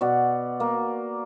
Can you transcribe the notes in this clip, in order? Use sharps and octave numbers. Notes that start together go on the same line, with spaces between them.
B2 D5 F#5
A#3